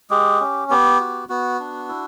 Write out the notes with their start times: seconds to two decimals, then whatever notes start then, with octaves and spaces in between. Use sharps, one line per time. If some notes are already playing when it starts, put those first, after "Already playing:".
0.10 G#3 G4
0.40 C#4
0.70 B3 G4
1.00 F#4
1.29 B3 F#4
1.60 D4
1.89 E4